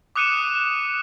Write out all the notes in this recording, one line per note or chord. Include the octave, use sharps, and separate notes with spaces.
D6 D#6 F#6 C#7 D#7 E7